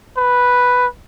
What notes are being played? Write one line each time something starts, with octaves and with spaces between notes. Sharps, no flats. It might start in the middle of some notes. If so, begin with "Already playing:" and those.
B4